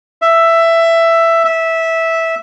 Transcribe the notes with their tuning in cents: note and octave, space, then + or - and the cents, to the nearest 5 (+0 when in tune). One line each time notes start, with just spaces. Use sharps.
E5 +10
E5 -10